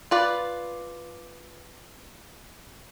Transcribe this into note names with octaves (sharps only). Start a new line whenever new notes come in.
F4 B4 D5